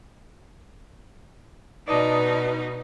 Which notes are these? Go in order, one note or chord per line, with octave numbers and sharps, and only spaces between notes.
B2 D#4 B4 D5 D#5 A5